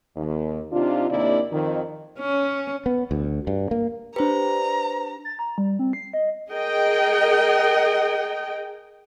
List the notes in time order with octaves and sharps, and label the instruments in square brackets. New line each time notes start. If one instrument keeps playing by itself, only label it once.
[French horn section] D#2
C3 D4 D#4 F4
D#2 C3 A#3 D4 E4 D5
F2 D#3
[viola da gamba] C#4
[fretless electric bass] B3
D2
G2
A#3
[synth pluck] D4 G4 [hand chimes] B4 C5 [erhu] A#5
[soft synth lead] A6
A#5
G3
C4
C7
D#5
[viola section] G#4 A#4 D#5 G5